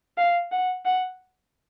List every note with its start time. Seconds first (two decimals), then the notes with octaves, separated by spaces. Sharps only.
0.17 F5
0.52 F#5
0.85 F#5